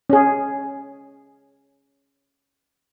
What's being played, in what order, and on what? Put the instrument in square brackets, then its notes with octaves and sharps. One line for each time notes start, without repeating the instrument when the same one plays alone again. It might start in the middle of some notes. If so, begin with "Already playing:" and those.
[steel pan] C#4 G#4